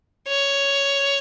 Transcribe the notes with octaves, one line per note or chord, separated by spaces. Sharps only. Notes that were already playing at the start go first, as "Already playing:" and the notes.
C#5